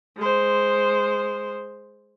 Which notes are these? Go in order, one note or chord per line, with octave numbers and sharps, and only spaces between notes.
G#3 C5